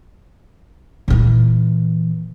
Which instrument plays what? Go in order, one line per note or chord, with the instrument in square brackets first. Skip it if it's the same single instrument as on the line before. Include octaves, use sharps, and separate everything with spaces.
[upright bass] A#2 E3